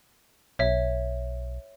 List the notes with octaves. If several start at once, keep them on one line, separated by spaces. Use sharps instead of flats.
B1 C#5 E5